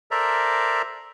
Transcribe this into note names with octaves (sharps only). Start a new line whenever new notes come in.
A4 A#4 C5 D5 E5 A#5